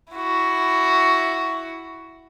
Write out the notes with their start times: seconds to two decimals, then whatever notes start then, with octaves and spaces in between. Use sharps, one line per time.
0.13 E4 F#4